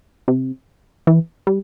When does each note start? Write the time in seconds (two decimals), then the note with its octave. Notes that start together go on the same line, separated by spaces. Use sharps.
0.28 C3
1.07 E3
1.47 G3